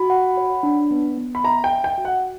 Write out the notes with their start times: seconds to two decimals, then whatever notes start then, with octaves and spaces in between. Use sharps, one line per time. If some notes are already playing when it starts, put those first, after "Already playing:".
Already playing: F#4 B5
0.10 F#5
0.37 C#5
0.63 D4
0.91 B3
1.18 B3
1.35 B5
1.44 E5 A#5
1.64 G5
1.71 E5
1.84 G5
1.98 F#4
2.05 F#5